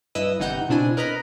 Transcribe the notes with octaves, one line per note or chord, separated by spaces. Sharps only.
G2 E4 B4 D#5 D#6 E6
G1 C3 E3 D#4 F#5 G6
C#2 B2 C4 D4 E4 G#5
A#4 B4 D#5 A#5 B5